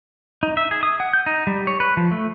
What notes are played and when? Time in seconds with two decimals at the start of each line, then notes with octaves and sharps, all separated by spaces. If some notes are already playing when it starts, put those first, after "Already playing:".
0.43 D#4
0.57 E5
0.71 G#4
0.83 D#6
1.00 F#5
1.13 G6
1.26 D#4
1.47 G3
1.67 C#5
1.80 B4
1.97 F3
2.11 A3